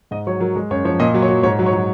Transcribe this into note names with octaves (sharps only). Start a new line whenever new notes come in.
G#2 D#5
F#3 C#5
F#3 A#4
G#3
F#2 C#5
F3 C#5
A#2 D#5
F#3
C#5
F#3
G#2 C#5
F#3
C#5
F#3